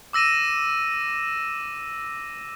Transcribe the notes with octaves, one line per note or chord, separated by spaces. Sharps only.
D6 E6 A#6 D#7 E7